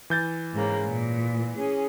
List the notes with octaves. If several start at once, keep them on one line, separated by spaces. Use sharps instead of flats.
E3 G6 A6
G#2 C#3 A#3
A#2
C#4 G#4